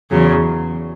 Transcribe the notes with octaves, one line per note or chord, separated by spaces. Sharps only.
E2 C#3 F#3